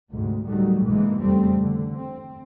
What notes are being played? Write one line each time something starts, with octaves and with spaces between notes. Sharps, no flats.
D2 G#2 C3
D2 A2 D#3 F#3 G3 A3
B1 G#2 D3 E3 G#3 A#3
F1 E2 C#3 G3 A3 C4
E2 D3
C4